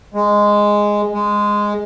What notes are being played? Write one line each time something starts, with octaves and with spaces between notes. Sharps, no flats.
G#3
G#3